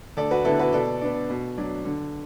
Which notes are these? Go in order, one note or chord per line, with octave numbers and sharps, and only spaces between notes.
D2 A4 D5
F#4 B4
D3 B3 E4 A4
F#4 B4
B2 A4 D5
B3 D4
B2
F#3 D4
D3